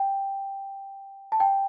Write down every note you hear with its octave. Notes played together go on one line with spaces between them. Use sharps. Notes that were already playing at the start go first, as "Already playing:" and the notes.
Already playing: G5
A5
G5